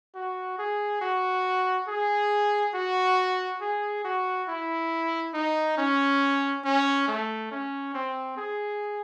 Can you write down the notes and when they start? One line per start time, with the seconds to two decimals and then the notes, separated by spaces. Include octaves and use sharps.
0.15 F#4
0.59 G#4
1.01 F#4
1.88 G#4
2.74 F#4
3.61 G#4
4.04 F#4
4.48 E4
5.34 D#4
5.78 C#4
6.65 C#4
7.08 A3
7.51 C#4
7.94 C4
8.37 G#4